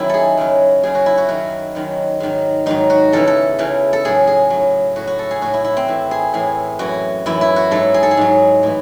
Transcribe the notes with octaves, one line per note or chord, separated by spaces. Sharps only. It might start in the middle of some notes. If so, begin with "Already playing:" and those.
Already playing: F#2 D#3 F#3 E4
G#4 A4
F#2 C#3 F#3
F#2 C#3 F#3 G#4
F#4
E4
F#4
F#2 D#3 F#3 F#4
F#2 D#3 F#3
G#2 D#3 F#3
G#2 D#3 F#3 D#4
F#4
E2 C#3 E3 A4
A4
E2 C#3 E3
A4
A2 F#3 G#4
G#4
A2 F#3
A2 F#3 F#4
F#4
A4
G#4
A2 F#3 F#4
E4
E4
C4
A2 E3
G#4
A2 E3 G#4
F#2 E3 F#4
F#2 E3 E4
E4
F#4
G#2 F#3 A4
G#4
A4
G#4
G#2 F#3
A2 E3